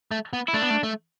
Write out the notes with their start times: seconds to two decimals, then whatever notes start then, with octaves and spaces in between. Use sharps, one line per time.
0.11 A3
0.33 B3
0.48 E4
0.54 A3 D4
0.62 B3
0.70 A3
0.83 A3